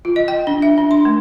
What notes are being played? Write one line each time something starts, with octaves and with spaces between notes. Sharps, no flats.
F4
D#5
G5
D4
E5
D4
C6
A3